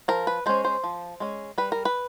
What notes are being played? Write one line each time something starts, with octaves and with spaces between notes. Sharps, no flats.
F3 A#4
B4
G#3 C#4 C5
C5
F3
G#3 C#4
G3 B4
A#4
B4